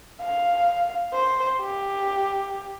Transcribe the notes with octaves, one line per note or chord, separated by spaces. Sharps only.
F5
C5
G4